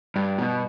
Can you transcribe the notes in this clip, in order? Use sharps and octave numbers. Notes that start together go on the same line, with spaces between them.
G2
B2